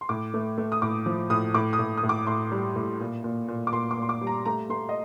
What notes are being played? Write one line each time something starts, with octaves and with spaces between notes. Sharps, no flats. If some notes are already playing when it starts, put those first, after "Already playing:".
C6
A2 D6
A3
A3
D#6
A2 D6
F3
A2 D#6
A2 D6
D#6
A2
D#6
A2
D6
A2 C6
G3
A2
A#2
A#2
A#2
D6
A#2 C6
D6
A#2 C6
D6
G3
A#5
A3 A#5
A3 C6
D#5